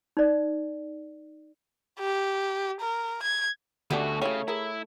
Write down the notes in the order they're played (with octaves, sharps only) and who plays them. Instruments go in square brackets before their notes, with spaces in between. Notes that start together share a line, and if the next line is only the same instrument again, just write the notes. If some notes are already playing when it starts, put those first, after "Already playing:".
[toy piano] D#4 D5
[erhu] G4
A#4
G#6
[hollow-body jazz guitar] D2 [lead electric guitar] B2 F#4 [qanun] A3 [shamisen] C#4 G4 D5
[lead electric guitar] C#3 [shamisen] F#3 E4 G4 [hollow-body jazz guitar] C#5
[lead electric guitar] E4 [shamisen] G#4 A#4